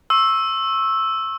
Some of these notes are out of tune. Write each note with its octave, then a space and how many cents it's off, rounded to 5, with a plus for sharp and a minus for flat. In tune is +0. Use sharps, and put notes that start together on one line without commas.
C#6 -30 E6 +0